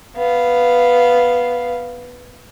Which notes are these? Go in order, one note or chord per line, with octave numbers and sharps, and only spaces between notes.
B3 F5